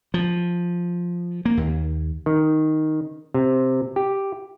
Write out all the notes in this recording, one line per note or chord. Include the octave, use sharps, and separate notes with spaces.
F3
A#3
D#2
D#3
C3
G4